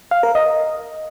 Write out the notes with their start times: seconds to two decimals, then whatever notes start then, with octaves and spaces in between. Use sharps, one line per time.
0.11 F5
0.23 A#4
0.35 D#5